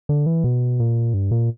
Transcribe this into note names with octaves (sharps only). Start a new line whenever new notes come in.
D3
E3
B2
A#2
G2
A#2